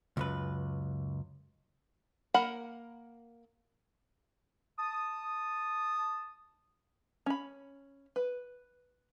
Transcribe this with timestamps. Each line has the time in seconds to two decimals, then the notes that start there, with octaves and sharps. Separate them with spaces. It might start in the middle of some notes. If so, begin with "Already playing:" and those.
0.17 C#2 F#2 B4
2.34 A#3 A#4 F#5 B5
4.78 A5 D#6
7.26 C#4 B5
8.16 B4